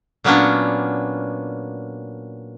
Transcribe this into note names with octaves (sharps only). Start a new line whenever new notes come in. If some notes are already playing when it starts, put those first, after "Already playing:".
A#2 F#3 A#3 B3 C#4 D4